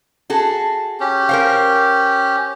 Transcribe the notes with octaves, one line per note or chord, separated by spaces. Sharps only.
F#4 G#4 A4
C#4 G4
A#4 C5 F5